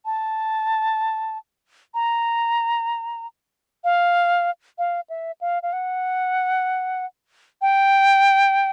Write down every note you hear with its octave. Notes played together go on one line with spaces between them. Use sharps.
A5
A#5
F5
F5
E5
F5
F5
F#5
G5